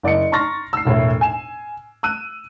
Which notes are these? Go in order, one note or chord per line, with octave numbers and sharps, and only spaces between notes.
F#1 D5 D#5 C#7
A#5 C6 C#6 F6 A6 A#6
E6 C7
E1 A2 E4 C#5
G#5 E7
E6 F#6 D#7